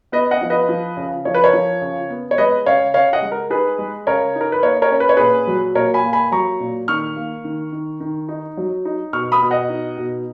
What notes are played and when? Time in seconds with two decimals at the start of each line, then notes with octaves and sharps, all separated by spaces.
0.12 B3 B4 D#5
0.31 D#5 F#5
0.41 F3
0.50 B4 D#5
0.68 F3
0.97 C#3
1.25 F3 C#5
1.35 B4
1.44 A#4 C#5
1.53 F3
1.82 C#3
2.10 B3
2.31 C#5
2.38 G#3 B4 D#5
2.66 C#3 C#5 F5
2.94 C#3 C#5 F5
3.13 D#5 F#5
3.22 G#3
3.32 A#4
3.50 D#4 G#4 B4
3.78 G#3
4.07 C#3 A#4 C#5
4.35 D#4
4.41 A#4
4.52 B4
4.63 A#3 A#4 C#5
4.82 A#4 C#5
4.91 C#4
5.00 B4
5.09 C#5
5.17 A#2 G#4 B4
5.47 F#3
5.75 A#2 A#4 C#5
5.94 G#5 B5
6.04 A#3
6.13 G#5 B5
6.32 F#3 A#5 C#6
6.60 A#2
6.88 D#3 C#6 F6
7.16 A#3
7.44 D#3
7.72 D#3
8.00 D#3
8.29 D#4
8.57 F#3
8.85 D#4
9.13 B2 C#6 F6
9.32 B5 D#6
9.42 B2
9.51 D#5 F#5
9.69 D#4
9.98 B2